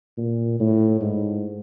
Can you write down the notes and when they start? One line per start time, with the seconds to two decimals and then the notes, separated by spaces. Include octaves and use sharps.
0.18 A#2
0.60 A2
1.01 G#2